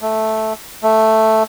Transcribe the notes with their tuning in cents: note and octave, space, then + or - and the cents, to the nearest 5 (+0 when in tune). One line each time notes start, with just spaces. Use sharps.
A3 -5
A3 +0